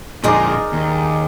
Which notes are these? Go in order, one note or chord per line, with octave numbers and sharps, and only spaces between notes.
F2 A#2 G#3 D#4 G#4 A#4 D5
D#2